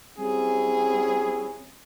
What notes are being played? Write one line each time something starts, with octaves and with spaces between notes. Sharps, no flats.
G3 C4 C#4 E4 G#4